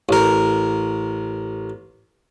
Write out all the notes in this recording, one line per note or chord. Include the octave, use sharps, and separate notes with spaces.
A1 A#4